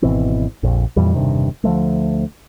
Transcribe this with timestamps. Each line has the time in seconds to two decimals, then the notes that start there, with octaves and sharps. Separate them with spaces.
0.02 G#1 B2 E3 C4
0.63 A#1 F2
0.96 F2 A#2 E3 G3
1.14 E1 G2 C3 D#3
1.64 D2 F3 G#3 A3